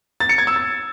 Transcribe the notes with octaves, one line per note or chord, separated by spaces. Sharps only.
A6
C#7
G#6
E6
A6